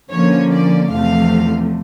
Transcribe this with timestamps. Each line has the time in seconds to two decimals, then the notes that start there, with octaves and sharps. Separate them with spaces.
0.10 D3 F3 A#3 C#4 C#5
0.50 D5
0.90 E2 C3 F3 A3 F5